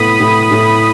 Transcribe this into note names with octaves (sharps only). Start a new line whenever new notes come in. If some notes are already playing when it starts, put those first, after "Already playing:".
Already playing: A2 B3 B5 D#6
A2
A2